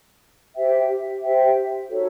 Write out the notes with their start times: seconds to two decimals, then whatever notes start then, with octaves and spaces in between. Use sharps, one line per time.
0.56 G4 C5 E5 G5
1.22 G4 C5 E5 G5
1.88 D#4 F#4 A4 C#5